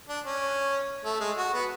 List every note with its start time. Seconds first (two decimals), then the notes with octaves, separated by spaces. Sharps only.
0.09 D4
0.25 C#4
1.05 A3
1.20 G#3
1.37 F#4
1.53 B3